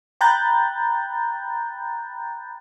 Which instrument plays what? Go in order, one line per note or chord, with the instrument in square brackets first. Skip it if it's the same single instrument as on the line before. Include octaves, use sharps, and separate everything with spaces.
[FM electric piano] G5 A#5 B5 F#6 G6 A6